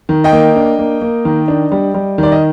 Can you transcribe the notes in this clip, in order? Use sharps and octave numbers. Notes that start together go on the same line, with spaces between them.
D#3
D#5 G5
A#3
D4
A#3
A#3
D#3
D4
G3
G3
D#3 D5
D#5